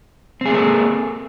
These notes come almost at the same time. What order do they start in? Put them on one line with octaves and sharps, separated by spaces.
C4 G#4 A#3 A4